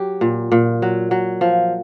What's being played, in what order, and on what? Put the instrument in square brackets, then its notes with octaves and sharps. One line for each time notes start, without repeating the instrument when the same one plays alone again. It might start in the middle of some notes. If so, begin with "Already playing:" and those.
Already playing: [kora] F#3 G4
A#2
A#2
F#3
F#3
F3